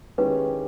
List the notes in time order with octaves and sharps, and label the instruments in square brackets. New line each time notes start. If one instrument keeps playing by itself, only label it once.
[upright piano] D#3 G#3 C#4 E4 G4 [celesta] B4